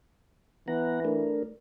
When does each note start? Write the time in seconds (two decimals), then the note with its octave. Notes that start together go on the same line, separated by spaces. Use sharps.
0.68 E3 B3 F#5 A#5
1.05 A3 D4 A#4